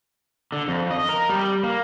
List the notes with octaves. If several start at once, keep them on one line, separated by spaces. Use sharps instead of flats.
D3
F2
D#5
A#4
G3
A#3